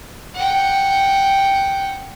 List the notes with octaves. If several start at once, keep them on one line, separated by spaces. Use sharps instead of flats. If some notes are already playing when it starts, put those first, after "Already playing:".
F#5 G5